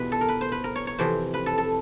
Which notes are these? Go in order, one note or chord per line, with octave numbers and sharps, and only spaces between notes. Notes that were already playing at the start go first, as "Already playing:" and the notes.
Already playing: E2 B2 G3 F4 B4
A4
A#4
B4
C5
B4
A#4
C#5
C#5
F2 C3 E3 C5
B4
A4
A4